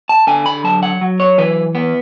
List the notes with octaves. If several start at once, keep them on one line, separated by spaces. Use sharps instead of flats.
A5
D3 G#5
B5
F#3 A5
F#5
F#3
C#5
E3 B4
B3